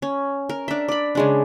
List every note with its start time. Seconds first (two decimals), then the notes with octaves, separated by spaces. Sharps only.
0.02 C#4
0.49 A#4
0.68 D4 E5
0.88 D5 B5
1.15 C#3 G#3 D4